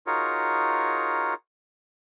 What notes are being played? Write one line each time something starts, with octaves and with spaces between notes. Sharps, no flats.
D#4 F4 F#4 G#4 A#4 C#5